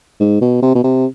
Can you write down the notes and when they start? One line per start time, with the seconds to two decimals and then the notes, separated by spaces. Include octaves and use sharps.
0.20 G#2
0.41 B2
0.62 C3
0.75 B2
0.84 C3